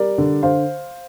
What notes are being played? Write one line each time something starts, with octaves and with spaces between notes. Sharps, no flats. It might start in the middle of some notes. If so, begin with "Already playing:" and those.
Already playing: G3 A#4 D5
D3
D3 C5 F5